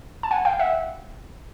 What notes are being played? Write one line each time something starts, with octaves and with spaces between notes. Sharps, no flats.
A5
F#5 G#5
F5 G5
E5 F#5